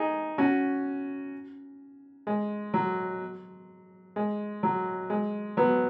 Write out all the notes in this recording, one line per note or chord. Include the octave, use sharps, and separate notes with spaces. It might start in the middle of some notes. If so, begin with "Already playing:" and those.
Already playing: D#4 G#4
C#4 F#4
G#3
F#3
G#3
F#3
G#3
F#3 B3